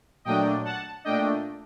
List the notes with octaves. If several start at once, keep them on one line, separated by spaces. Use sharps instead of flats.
A#2 F#3 A3 D4 D#5 G5
F#5 A5
A#2 A3 D4 D#5 G5